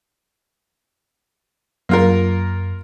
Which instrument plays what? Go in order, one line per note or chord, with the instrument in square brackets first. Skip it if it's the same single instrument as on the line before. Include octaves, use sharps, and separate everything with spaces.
[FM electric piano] F#2 [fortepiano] A#3 F4 A#4